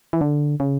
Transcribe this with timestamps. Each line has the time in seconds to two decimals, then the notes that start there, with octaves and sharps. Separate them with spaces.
0.13 E3
0.21 D3
0.60 C#3